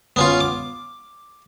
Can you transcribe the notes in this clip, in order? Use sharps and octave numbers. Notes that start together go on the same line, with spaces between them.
B3 C#4 F4
D6